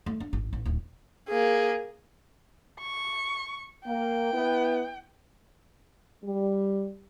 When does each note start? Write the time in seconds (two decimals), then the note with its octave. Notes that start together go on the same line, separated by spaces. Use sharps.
0.06 A3
0.20 D4
0.33 G#1
0.53 A1
0.66 D1
1.29 A#3 G#4
2.80 C#6
3.86 A#3 G5
4.33 B3 E4
6.25 G3